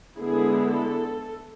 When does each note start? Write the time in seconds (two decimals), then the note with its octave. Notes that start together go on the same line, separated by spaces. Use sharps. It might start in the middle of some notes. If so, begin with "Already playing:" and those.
0.18 D3 G#3 B3 E4 G#4
0.72 A4